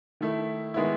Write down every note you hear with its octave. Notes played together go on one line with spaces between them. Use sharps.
D#3 A3 E4
D#3 G#3 B3 E4